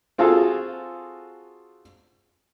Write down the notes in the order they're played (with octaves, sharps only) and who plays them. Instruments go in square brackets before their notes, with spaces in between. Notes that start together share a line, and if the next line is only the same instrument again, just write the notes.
[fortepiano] C4 F4 F#4 G#4 A4